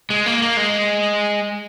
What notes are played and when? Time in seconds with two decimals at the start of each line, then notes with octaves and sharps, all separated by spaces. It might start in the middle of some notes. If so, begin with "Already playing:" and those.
0.10 G#3
0.26 A#3
0.42 A#3
0.57 G#3